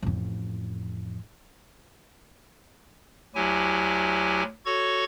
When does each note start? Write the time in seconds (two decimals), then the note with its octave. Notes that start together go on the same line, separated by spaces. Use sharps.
0.02 A1 F2
3.35 D2 F#3 E4 G4 G#5
4.66 F#4 A4 C#5 C#6 G#6